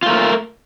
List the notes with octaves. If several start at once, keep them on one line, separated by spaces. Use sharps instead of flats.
A3 F4 A#4